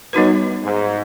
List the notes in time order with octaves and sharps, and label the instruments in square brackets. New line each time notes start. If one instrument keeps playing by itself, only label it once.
[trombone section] F#2 [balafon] G3 B3 D#4 F#4 B4
[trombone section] G#2